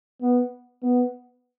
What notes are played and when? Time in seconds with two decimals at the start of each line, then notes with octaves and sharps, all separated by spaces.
0.22 B3
0.83 B3